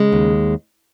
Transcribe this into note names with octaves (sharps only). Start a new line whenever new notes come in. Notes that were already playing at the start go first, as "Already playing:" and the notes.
Already playing: C#3 G#3
D#2